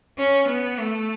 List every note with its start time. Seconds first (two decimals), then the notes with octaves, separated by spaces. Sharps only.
0.18 C#4
0.49 B3
0.79 A3